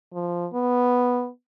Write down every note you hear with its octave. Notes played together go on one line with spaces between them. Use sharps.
F3
B3